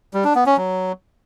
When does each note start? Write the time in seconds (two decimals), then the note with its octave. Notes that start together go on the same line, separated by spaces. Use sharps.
0.14 G3
0.24 D4
0.35 B3
0.46 C#4
0.57 F#3